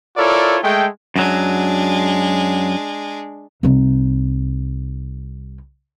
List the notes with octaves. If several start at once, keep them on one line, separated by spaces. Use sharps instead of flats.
E4 F4 A4 A#4 C#5 D5
G#3 A3 G5
F#2 F#3 G#3 D4
C2 D#4